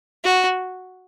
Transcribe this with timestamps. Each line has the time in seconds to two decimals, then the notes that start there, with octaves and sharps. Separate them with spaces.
0.24 F#4